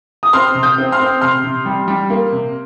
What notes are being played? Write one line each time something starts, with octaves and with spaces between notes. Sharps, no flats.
D#6
C4 C6 F6
C3
D#6 G6
C4
C6 F6
C4
C3 C6 F6
C3
G3
G3
A#3
C3